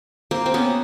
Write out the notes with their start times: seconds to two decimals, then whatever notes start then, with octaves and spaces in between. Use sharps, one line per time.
0.31 A#3 C4
0.46 C4
0.54 B3 C#4